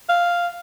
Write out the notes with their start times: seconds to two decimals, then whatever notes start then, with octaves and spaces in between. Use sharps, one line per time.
0.09 F5